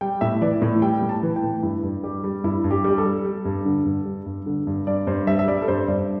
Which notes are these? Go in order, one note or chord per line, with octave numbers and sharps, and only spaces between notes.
G3 G5
A2 E5
E3 D5
A2 E4
G3 G5
A2
A5
E3
G5
A2
G2 E4
G2
G3 G4
G3
G2 E4
G2
G4
G3
G4
A4
G3
G3
G2
D3
G2
G3
G2
D3
G2
G2 D5
G2 C5
G3 E5
E5
G3 D5
A4
G2 C5
G2 D5